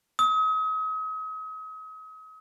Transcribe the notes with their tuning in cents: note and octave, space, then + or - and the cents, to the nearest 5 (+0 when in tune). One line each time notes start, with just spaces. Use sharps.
D#6 +40